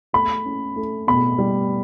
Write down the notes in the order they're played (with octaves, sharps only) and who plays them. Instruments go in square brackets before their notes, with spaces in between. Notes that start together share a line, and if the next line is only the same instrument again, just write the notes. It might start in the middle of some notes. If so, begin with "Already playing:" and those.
[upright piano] A3 [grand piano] B5
[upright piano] C#4
A3
[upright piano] B2 [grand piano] B5
[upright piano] G3